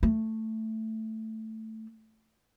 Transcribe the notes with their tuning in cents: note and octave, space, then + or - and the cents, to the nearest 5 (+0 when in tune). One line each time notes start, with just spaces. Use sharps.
A3 +5